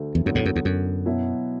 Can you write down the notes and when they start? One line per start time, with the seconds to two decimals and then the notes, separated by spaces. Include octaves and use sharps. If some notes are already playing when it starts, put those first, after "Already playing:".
Already playing: D2 D3 A3 D4
0.15 E2
0.25 F#2 D3 F#3 B3 E4
0.35 E2 A2
0.45 F#2
0.56 E2
0.65 F#2
1.06 B2 F#3 B3 E4